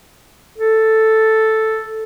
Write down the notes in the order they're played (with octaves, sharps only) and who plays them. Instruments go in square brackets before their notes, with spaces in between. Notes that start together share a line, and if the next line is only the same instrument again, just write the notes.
[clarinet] A4